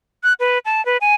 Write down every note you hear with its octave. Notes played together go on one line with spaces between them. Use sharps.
F#6
B4
A5
B4
G#5